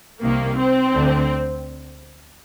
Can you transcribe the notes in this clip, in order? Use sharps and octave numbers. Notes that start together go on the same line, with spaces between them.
C2 C3 D#3 A#3
C4
D2 D3